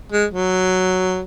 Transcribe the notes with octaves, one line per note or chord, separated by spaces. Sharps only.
G#3
F#3